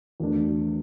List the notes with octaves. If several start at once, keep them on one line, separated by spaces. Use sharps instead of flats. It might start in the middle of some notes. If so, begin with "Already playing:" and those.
E2 E3 A3 D4 F#4